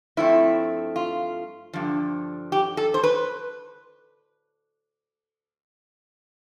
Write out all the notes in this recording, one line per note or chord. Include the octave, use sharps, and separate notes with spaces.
G2 F3 A3 C4 E4
F4
G2 D3 F3
G4
A4
C5
B4